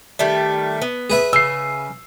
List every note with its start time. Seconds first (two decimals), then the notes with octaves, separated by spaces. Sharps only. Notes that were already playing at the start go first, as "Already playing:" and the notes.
0.19 D#3 G3 A3
0.82 B3
1.10 G#4 B4 E5
1.33 C#3 E6 C7